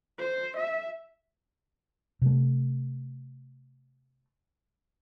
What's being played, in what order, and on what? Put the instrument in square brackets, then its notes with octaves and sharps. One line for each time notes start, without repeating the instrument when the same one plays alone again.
[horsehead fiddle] C5
E5
[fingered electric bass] C3 A3